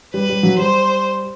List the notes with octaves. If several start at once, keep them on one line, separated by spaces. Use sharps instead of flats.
G3 B4
G3
F#3
G3 C5